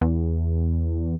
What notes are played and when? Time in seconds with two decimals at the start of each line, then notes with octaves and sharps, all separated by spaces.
0.01 E2